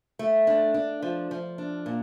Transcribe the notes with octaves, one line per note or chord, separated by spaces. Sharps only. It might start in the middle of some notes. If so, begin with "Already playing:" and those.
A3
D4
D4
F3
F3
D4
A#2